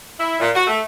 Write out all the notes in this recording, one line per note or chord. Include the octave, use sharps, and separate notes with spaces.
E4
A#2
F#4
A3